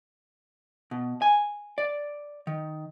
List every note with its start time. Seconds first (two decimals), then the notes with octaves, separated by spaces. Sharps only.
0.91 B2
1.22 G#5
1.78 D5
2.47 D#3